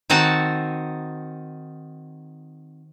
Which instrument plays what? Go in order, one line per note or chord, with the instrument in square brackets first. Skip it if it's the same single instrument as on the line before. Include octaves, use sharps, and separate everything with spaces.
[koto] D#3 C4 D#4 F#4 A5